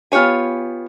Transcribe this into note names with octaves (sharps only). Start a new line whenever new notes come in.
B3 F4 G4 C#5 G#5